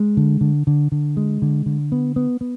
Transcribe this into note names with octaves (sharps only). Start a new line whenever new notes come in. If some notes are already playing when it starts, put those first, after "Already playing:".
Already playing: G#3
D3
D3
D3
D3
G#3
D3
D3
B3
B3
B3